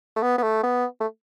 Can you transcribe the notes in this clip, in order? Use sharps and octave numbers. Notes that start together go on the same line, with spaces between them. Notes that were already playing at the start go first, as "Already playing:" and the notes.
A3
B3
B3
A3
B3
A3